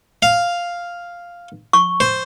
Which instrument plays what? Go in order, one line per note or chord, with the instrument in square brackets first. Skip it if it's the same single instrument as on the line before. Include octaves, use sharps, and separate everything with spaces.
[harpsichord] F5
[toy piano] C#6
[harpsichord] C5